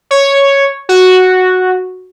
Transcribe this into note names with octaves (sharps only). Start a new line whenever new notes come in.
C#5
F#4